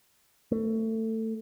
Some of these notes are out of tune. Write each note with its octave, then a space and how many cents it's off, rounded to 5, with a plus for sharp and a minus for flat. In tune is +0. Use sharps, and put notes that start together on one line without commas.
A3 +20